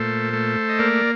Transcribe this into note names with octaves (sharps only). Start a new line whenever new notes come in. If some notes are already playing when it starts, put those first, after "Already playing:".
Already playing: A#2 A3 A4 C5
A3
D#5
A#3 A#4 D5